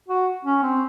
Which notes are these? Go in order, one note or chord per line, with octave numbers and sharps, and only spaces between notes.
F#4
C#4
C4